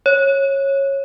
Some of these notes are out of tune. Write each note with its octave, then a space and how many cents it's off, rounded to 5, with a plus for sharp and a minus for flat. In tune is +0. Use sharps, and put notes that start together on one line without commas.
C#5 -15